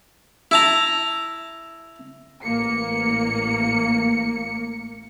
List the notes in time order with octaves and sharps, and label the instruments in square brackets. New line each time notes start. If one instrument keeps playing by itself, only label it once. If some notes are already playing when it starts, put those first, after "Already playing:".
[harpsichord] E4 A5 A#5
[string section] A1 A#3 C#7